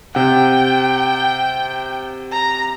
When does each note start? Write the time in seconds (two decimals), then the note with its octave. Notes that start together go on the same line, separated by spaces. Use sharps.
0.15 C3 F#5 G5
2.32 A#5